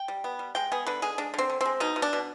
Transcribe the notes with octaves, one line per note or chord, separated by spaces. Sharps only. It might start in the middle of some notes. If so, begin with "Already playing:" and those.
Already playing: G5
G3
B3
G3
G#3 G5
B3 G#4
D3 B4
G#3 G#4
G#3 D4
D3 C4
D3
G#3 C4
B2 D#4
B2
D4
B2